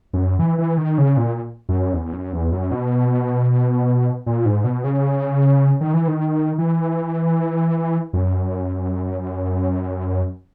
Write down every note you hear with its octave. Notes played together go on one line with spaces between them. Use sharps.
F#2
E3
E3
D#3
C#3
A#2
F#2
E2
F#2
E2
F#2
B2
A#2
G#2
B2
C#3
D#3
E3
D#3
E3
F#2